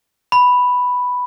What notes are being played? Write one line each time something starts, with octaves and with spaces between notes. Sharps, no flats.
B5